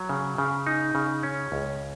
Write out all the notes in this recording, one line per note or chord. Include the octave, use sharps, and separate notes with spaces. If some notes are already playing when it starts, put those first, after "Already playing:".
Already playing: F#3
C#3
C#3
D#4
C#3
C#4
C#2